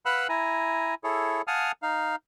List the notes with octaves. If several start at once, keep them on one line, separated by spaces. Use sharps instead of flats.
B4 F5 F#5 B5 E6 F#6
E4 G#5 A#5
E4 G#4 A4 C#5
F5 F#5 G#5 A5 D#6 F6
D#4 F5